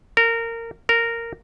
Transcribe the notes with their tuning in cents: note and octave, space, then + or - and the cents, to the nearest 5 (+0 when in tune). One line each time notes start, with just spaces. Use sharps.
A#4 -20
A#4 -10